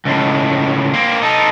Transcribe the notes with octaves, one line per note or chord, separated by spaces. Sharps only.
C#2 A2
A#3 C4
D#4 A4